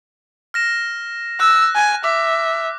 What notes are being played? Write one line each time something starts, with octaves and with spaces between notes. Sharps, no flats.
F6 A#6 E7
E6 F#6 A#6
G#5
E5 D6